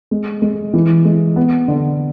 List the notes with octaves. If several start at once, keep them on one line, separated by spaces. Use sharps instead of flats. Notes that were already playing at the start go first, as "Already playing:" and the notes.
G#3
G#3
E3
G#3
B3
D3